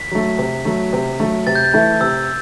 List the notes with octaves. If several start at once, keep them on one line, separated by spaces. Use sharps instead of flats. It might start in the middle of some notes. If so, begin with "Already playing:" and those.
Already playing: B6
F#3 A3
C3
F#3 A3
C3
F#3 A3
C3 A6
G6
A6
E3 A3 E4 A4
C3 E6